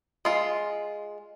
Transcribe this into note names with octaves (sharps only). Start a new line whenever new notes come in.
G#3 F4